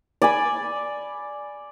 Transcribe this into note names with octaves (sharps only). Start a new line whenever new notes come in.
D5 G#5 B5